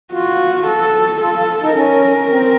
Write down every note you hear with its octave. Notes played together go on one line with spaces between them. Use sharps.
F4 F#4
A4
F4 A4
F4
D#4
C#4 A#4
C4